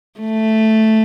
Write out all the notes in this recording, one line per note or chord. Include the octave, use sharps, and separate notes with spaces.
A3